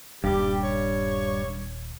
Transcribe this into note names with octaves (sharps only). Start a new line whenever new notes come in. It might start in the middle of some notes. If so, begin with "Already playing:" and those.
D#1 G2 G3 G4
C#5